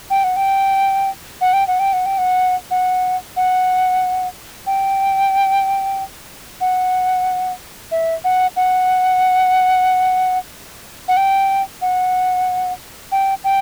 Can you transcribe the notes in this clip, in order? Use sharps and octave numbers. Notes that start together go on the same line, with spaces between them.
G5
F#5
G5
F#5
G5
F#5
G5
F#5
G5
F#5
F#5
F#5
G5
F#5
E5
F#5
F#5
F#5
G5
F#5
G5
G5